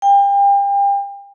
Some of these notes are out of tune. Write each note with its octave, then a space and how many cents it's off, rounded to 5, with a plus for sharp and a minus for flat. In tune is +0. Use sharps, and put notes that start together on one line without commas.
G5 +35